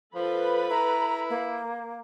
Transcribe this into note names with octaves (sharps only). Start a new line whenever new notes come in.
F3 A4 B4 B5
E4 A#5
A#3